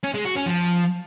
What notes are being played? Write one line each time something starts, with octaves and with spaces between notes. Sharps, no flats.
C#4
G#3
F#4
C#4
F3